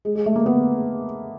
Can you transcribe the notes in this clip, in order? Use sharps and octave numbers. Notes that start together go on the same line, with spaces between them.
G#3
G#3
A3
A#3
B3